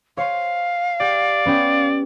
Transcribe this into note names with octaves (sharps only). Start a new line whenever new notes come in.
C5 C#5 F5
G4 D5
B3 C#4 G4